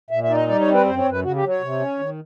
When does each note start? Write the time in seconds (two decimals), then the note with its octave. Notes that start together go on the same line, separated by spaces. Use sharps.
0.10 A#2 E5
0.24 E5
0.29 D#4 D5
0.36 D#5
0.48 G3 D5
0.61 C#5
0.67 C4
0.74 B4
0.86 F#2 C5
0.98 C#5
1.05 F#2
1.11 B4
1.23 C#3 F#4
1.36 G4
1.43 F#3
1.48 C#5
1.61 C3
1.79 C#4
1.99 D#3